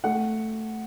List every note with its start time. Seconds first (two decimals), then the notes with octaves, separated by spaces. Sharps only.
0.04 A3 F#5